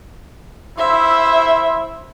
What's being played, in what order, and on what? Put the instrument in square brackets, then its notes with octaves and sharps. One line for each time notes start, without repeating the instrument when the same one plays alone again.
[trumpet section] E4 C5 [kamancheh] E5